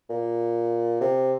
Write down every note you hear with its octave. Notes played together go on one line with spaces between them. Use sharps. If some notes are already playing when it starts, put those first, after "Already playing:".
A#2
C3